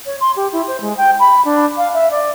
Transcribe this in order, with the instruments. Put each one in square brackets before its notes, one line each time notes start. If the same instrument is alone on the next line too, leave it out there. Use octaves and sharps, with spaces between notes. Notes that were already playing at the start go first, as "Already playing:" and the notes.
[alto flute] C#5
C6
G4
E4
C5
G#3
G5
B5
D4
F5
E5
D5